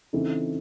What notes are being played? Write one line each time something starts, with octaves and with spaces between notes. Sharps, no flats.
C#3 E3 C4 D#4 A4